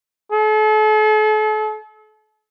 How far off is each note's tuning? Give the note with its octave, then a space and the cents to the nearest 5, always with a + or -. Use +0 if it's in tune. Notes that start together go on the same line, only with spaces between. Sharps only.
A4 -40